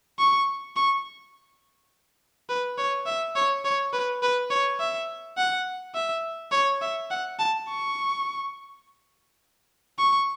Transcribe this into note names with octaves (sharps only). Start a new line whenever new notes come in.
C#6
C#6
B4
C#5
E5
C#5
C#5
B4
B4
C#5
E5
F#5
E5
C#5
E5
F#5
A5
C#6
C#6